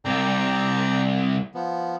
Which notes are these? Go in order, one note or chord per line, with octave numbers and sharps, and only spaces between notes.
C2 C3 D5 G5 A#5
F3 B3